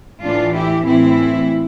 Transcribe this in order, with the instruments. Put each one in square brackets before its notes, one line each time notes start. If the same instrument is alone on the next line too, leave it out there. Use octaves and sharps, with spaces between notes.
[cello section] A2 E3 D4 F4
E4 G4
A2 E3 C4 E4